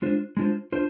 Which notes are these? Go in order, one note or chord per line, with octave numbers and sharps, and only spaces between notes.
G#3 D4 F4 C5
G#3 D4 F4 C5
D4 F4 C5